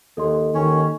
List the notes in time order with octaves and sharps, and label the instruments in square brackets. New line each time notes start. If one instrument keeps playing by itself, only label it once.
[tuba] D#2 [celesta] A4 D#5 C6
[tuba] D#2 [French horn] D#3 [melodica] C#4 C#5